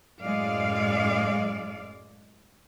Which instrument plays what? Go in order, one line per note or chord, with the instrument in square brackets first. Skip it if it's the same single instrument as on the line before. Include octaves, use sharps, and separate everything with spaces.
[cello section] F#2 A2 G#3 D5 F5